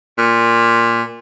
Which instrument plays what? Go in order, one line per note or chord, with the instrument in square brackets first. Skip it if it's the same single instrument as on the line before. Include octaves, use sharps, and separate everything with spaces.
[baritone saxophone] A#2